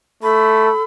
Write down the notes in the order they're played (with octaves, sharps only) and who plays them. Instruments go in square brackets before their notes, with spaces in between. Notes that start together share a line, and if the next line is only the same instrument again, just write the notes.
[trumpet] A3 [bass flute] A4 [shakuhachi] B5